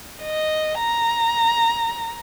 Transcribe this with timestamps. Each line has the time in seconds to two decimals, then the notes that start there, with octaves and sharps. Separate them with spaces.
0.22 D#5
0.79 A#5